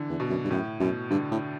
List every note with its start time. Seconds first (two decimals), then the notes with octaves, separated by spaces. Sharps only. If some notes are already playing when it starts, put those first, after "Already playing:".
Already playing: D3 E3
0.10 E2
0.20 B2
0.30 F#2
0.45 G2
0.50 F#2 A2
0.80 F#2 B2
1.11 G2 D3
1.32 A2